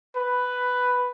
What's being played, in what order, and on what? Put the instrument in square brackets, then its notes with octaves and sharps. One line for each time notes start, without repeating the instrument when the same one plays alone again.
[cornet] B4